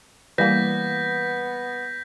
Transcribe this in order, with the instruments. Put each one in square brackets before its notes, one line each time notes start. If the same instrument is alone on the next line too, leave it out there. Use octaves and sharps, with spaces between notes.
[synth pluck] E3 G3 A#3 [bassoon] B3 [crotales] G6 A#6 B6